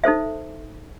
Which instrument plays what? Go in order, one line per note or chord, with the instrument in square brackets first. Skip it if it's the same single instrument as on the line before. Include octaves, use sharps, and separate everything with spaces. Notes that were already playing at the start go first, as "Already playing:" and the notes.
[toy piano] D#4 A4 C5 E5